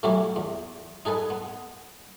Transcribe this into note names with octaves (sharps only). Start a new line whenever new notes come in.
A2 E3 F#3 C#4 E4 G4
E2
D#4 G#4 A4 B4 G#5
B3